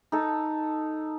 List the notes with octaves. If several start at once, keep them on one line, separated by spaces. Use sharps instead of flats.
D#4 A4